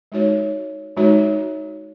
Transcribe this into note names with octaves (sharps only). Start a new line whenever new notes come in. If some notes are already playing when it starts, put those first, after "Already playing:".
G#3 D#4 F#4 C#5
G#3 D#4 F#4 C#5